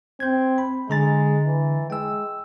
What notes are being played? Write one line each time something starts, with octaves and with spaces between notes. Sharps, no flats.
C4 G6 G#6
B5
D3 G#3 A#5 A6
E3
G#3 G5 E6